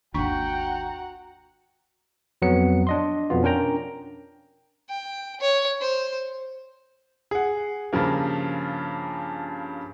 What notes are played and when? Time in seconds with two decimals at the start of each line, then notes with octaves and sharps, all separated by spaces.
0.14 G#1 D#2 D4 F#4 F#5 G5 A#5 C#6
2.42 F2 F#3 B3 C#7
2.87 D4 D#5 C6
3.30 F2 B2 B3 F4
3.43 C#4 D4 A#4 G5 A#5
4.89 G5
5.40 C#5
5.81 C5
7.31 G#4 F#5
7.93 G2 C#3 F3 A#3